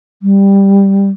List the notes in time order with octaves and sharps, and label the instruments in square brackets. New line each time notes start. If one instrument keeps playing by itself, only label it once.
[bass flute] G3